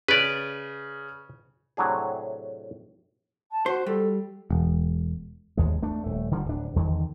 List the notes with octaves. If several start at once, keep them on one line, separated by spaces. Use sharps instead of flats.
C#3 B4 D5
A2 C3 F#3 D4 G#4
A5
F#4 C5
G3 A4
E1
G#1 D#2 G#3
A3 D4
D#1 A3
D3 D#3 F3 G3
D1 D4
E2 D3 D#3